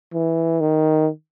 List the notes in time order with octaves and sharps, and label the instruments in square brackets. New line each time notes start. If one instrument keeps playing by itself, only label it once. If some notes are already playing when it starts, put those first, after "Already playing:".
[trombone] E3
D#3